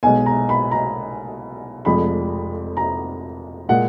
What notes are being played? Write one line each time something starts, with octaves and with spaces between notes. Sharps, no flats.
B1 B2 G#3 G#5
A#5
B5
A#5
F1 F2 F3 G#3 B5
A#5
A#2 G#3 F#5